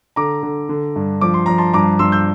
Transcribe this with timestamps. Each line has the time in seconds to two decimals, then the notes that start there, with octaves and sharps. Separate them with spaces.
0.16 D3 A#5 D6
0.43 D3
0.69 D3
0.96 G2
1.21 F3 D6
1.34 C6
1.46 F3 A#5
1.58 A5 C6
1.73 G2 A#5 D6
1.99 G2 C6 E6
2.12 E6 G6